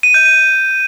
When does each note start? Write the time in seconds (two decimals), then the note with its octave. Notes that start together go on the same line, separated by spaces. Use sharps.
0.03 D#7
0.14 G6
0.25 D#7